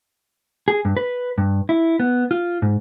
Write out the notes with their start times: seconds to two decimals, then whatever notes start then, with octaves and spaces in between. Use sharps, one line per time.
0.68 G#4
0.85 G2
0.97 B4
1.38 G2
1.69 E4
2.00 B3
2.31 F4
2.62 G#2